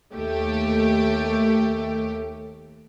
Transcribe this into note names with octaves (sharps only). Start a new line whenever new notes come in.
D#2 A3 G4